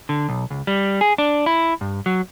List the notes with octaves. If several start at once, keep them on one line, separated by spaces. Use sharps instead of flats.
D3
B1
C#2
G3
G#4
D4
E4
G2
F#3